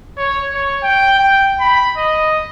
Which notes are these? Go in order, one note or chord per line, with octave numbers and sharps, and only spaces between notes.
C#5
C#5
G5
G5
B5
D#5